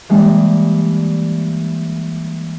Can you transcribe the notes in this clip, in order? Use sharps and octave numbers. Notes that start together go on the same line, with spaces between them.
E3 G3 G#3 A#3 D4